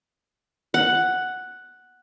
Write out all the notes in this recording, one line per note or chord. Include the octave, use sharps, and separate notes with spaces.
F#5